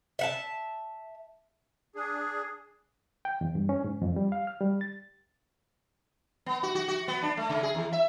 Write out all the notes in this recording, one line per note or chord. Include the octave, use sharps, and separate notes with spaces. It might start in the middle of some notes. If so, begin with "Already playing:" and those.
E5 F#5 A5
D4 G#4
G5
E2
G2
C#4
G#2
F2
G3
F5
F6
G3
A6
B3
F#4
F#4
F#4
B3
D4
A3
C#3
G#4
E2
E5